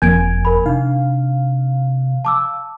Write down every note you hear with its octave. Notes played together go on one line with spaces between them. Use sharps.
F#1 F2 A#3 G#5 G6 G#6 D7
A#4 B5
C3 D4 D#4 F5
A5 D6 E6